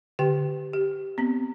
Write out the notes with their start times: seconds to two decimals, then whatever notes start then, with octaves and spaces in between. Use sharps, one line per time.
0.19 D3 G4 G5
0.73 G4
1.18 B3 C4